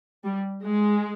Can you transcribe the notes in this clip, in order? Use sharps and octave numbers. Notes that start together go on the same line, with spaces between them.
G3
G#3